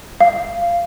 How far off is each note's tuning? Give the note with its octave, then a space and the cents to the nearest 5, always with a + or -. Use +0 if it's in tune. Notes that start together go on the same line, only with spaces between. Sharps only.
F5 -15